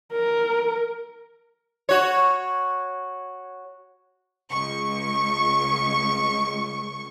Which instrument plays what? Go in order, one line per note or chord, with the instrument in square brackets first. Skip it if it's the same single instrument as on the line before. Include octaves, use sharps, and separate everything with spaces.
[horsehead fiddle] A#4
[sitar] F#4 C#5
[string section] C#2 C#6